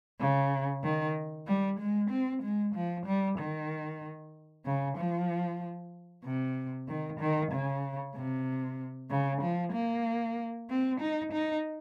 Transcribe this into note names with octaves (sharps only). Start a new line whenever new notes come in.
C#3
D#3
G3
G#3
C4
G#3
F3
G3
D#3
C#3
F3
C3
D#3
D#3
C#3
C3
C#3
F3
A#3
C4
D#4
D#4